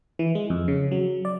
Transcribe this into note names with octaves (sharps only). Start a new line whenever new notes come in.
E3
G#3
F2
C#3
F#3
D5